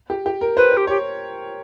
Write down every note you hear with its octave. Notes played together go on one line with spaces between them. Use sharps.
G4
G4
A#4
B4 C5
C5
G4
G4 C#5